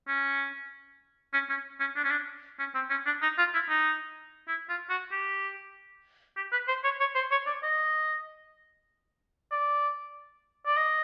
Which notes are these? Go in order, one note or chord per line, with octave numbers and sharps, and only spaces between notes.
C#4
C#4
C#4
C#4
D4
C#4
D4
C#4
C4
C#4
D4
D#4
F4
E4
D#4
E4
F4
F#4
G4
G4
B4
C5
C#5
C#5
C5
C#5
D5
D#5
D5
D5
D#5